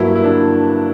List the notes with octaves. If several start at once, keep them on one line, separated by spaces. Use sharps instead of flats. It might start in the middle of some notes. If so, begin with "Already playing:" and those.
Already playing: G2 F#3 A#3 E4
E4
D4